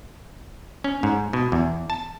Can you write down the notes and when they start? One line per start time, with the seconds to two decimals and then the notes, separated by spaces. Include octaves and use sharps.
0.84 C#4
1.03 G#2
1.33 B2
1.52 E2
1.90 A5